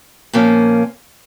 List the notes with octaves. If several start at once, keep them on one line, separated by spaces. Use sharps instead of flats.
A#2 F3 A#3 C#4